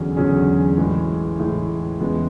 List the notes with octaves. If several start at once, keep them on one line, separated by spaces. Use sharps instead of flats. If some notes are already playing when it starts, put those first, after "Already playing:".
Already playing: E2 D3 F#3 C#4 G#4
E2 D3 F#3 C#4 G#4
A2 E3 G#3
A2 E3 G#3
E2 C#3 G#3 B3